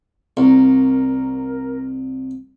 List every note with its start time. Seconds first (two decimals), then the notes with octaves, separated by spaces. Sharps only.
0.37 C2 A#4